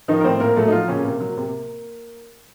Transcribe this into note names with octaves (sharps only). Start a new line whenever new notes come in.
D#3 F3 D#4
A#4
A2 C4 C5
A#2 A#3 A#4
F#3 A3 A4
D#4
F3 F#3 F4
A#2 C#3 C#4
C3 A#3
F#3
C3